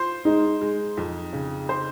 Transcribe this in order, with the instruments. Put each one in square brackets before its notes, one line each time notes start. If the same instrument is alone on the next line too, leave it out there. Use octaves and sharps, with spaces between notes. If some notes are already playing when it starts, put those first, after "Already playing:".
Already playing: [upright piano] F4 C5
[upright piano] G#3 [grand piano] D#4
[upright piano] G#3
F2
C#3
C5